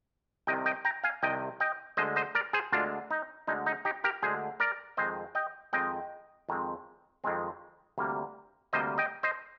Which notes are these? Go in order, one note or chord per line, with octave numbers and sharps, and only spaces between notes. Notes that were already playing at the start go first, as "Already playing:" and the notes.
C2 C3 D#3 D#5 G5
D#5 G5
G5 A#5
F5 G#5
C2 C3 D#3 D#5 G5
D#5 G5
D2 D3 G#3 C5 D#5
C5 D#5
A#4 D5
G#4 C5
D2 D3 G#3 D4 F4
D#4
D2 D3 G#3 D#4
D#4
D#4 G4
G4 A#4
D2 D3 G#3 G#4 C5
A#4 D5
F2 D#3 G#3 C4 C5 D#5
D#5 G5
F2 D#3 G#3 C4 D#5 G5
F2 D#3 G#3 C4
F2 D#3 G#3 C4
D2 C3 G3 A#3
D2 C3 G3 A#3 C5 D#5
D#5 G5
C5 D#5